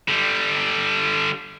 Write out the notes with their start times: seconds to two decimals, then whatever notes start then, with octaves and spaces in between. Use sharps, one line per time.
0.08 D3 G3